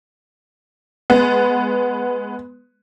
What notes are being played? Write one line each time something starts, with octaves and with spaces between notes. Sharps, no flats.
G#3 B3